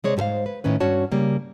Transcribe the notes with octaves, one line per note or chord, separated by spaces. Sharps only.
C3 G#3 C#5 D5
G#2 G4 A4 C5 F5
B4
A2 D#3 C#4 B4
G2 C#4 F#4 C#5 A5
C#3 G3 A#3